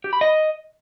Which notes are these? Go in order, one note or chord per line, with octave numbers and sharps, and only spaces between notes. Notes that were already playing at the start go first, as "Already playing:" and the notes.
G4
B5
D#5